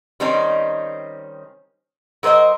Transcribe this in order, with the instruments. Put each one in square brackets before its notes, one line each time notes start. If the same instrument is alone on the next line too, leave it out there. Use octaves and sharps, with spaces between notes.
[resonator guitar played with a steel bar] D#3 G3 C4 C#4 D#4
F#3 A#4 C5 D5 D#5